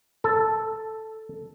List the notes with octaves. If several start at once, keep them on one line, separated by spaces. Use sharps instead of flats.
A4